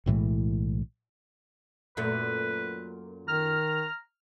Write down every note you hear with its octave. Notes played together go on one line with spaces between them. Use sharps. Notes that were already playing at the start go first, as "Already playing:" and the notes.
B1 A2 E3 G#3
F#2 A#2 A3 B4
D#3 A#5 F6